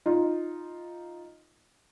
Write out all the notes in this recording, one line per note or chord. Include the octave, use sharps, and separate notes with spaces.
D#4 F4